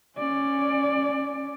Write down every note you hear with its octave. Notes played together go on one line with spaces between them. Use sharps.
C#4 D5